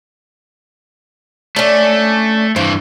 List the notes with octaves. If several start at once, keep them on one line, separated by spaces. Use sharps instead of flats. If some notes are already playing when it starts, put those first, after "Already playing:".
A3 C#4 D4
G2 E3 C5